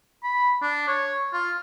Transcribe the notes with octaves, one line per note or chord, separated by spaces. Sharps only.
B5
D4
C#5
F4